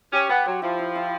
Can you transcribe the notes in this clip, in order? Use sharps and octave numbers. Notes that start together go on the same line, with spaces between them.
C#4 G4
B3 G4
F#3 C5
F3 E4
E4
E4